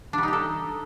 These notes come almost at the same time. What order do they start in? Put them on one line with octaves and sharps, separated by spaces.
D4 G3 D#4 G4 A4